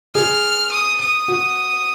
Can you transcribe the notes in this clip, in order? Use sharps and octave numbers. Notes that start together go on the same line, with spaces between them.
G#4 F6
D#6
D#6
F#4